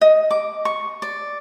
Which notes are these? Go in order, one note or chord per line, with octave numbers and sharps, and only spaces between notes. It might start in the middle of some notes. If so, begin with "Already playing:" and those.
D#5
D6
C#6
D5